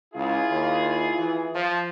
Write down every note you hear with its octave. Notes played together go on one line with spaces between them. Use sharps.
C#2 E4 F4 G#4
D#2
E3
F3